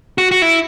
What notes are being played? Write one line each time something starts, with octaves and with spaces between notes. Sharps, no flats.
F#4
F#4
E4